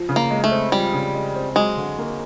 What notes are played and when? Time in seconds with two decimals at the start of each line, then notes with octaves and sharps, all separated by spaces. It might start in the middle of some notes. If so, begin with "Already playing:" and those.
Already playing: F3
0.09 C#3
0.16 A#3
0.31 G#3
0.44 A3
0.51 C4
0.72 F3 G3
0.93 C#3
1.15 G#3
1.36 C4
1.56 F#3 G#3
1.77 D3
1.98 A#3